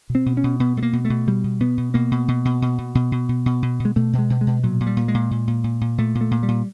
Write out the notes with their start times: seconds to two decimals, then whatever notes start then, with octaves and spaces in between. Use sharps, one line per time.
0.10 B2
0.15 C4
0.26 B2
0.37 C#4
0.44 B2
0.60 B2 B3
0.77 B2 A3
0.82 A#3
0.93 B2
1.05 A3
1.10 B2
1.27 B2 G3
1.44 B2
1.60 B2 B3
1.78 B2
1.94 B2 A#3
2.11 B2
2.28 B2
2.45 B2
2.62 B2
2.78 B2
2.95 B2
3.12 B2
3.29 B2
3.46 B2
3.62 B2
3.80 B2
3.85 G#3
3.96 B2 A3
4.13 B2
4.18 G#3
4.30 B2
4.41 G#3
4.47 B2
4.63 A#2 F#3
4.80 A#2
4.86 G3
4.97 A#2
5.08 G#3
5.14 A#2
5.31 A#2
5.47 A#2
5.64 A#2
5.81 A#2
5.98 A#2 A3
6.15 A#2
6.21 A3
6.31 A#2
6.43 G3
6.48 A#2